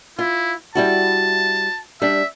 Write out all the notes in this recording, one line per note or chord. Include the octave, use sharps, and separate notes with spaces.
E4 F4
G3 E4 F#4 A5
G3 D4 E5